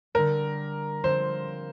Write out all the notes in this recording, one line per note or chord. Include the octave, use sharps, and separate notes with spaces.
D3 G3 D4 G4 A#4
D3 F3 C4 C5